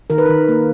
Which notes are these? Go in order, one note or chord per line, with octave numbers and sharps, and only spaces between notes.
D#3 A#4
B4
D#3 A#4
A#3